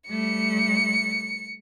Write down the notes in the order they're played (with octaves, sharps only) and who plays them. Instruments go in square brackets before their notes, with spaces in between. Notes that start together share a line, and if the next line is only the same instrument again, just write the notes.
[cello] G3 A3 [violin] C#7